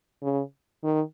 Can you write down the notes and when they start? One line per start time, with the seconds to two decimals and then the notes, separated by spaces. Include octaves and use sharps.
0.22 C#3
0.83 D#3